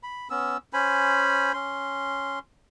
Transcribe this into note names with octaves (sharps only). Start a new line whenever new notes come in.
B5
B3 C#4 E6
C#4 C5 G#5 B5
C#4 C6